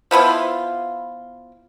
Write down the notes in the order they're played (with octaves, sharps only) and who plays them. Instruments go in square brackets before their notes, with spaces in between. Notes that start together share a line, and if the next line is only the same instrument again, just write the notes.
[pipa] F3 B3 E4 F4